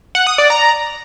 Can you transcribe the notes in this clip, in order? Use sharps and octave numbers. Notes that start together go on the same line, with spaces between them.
F#5
D#6
D5
A#5